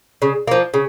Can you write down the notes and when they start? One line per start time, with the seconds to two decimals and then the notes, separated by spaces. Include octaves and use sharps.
0.22 C#3
0.47 F3 A#3
0.74 C#3